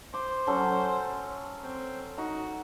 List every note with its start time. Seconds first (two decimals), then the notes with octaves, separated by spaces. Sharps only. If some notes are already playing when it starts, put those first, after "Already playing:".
0.14 C5 D6
0.47 F#3 C#4 A4
1.63 C4
2.18 D#4 F#4